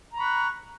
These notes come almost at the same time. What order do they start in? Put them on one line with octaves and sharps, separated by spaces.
A#5 B5 C#6 F#6